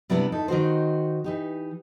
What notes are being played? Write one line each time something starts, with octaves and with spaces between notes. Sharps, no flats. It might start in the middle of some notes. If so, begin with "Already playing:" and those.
C3 G3 B3 D4 E4
E2 D#4 E4 A4
D#3 D#4 F#4 C5
E3 D#4 G4